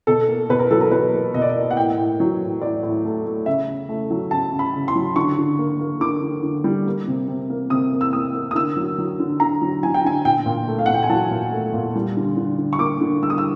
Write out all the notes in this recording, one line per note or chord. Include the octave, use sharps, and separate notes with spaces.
B2 A4
A#3
B2 B4
A#4
F#3 A4
A#4
F#3 B4
A#3
B2 D#5
D5
D#5
A#3
F#5
A2 G5
A2
F#3
A2
A2 D5
A2
A3
A3
C#3 E5
C#3
A3
F#3
C#3 A5
C#3
B5
C#3
C6
F#3
D3 C#6
D3
A#3
A#3
D3 D6
D3
D3
G3
A#3
C3
C3
A#3
C3 D#6
A#3
E6
A#3 D#6
A#3
D#6
D3 E6
F#3
F#3
D3
D3 A#5
F#3
F#3 G#5
G5
D3 G#5
A#2 G5
A#2
A3
F5
A#2 F#5
G5
G#5
F#3 A5
A#2
A3
A#2
G3
D3
D3
D3
C#6
A#3 D6
D3
G3 E6
D#6
E6